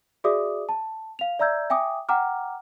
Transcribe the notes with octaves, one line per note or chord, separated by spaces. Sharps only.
F#4 G#4 D5 E5 D6 D#6
A5
F5 F7
D5 E5 A#5 E6 G6 G#6
E5 G5 G#5 D6 D#6
F#5 G5 A#5 D6 F6